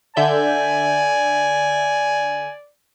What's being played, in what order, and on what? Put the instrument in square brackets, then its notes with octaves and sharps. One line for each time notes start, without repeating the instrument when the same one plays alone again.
[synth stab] D3 E5 G6 [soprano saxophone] D5 [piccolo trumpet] G#5